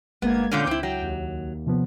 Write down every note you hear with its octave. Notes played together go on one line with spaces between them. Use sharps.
G1 G#3 A#3 B3 G#6
A#2 D3 C#4 G6
C#2 C4 E4
F#3 G5
D#2
C3 F3 B3